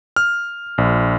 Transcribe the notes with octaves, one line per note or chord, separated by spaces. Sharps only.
F6
A#1